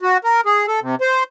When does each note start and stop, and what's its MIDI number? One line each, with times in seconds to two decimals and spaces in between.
0.01 0.18 66
0.24 0.41 70
0.46 0.66 68
0.68 0.80 69
0.82 0.95 48
1.01 1.23 72